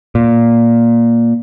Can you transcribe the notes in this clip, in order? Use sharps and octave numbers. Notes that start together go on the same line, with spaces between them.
A#2